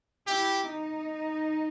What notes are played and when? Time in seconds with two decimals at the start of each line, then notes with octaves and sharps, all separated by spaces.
0.27 E4 G4
0.65 D#4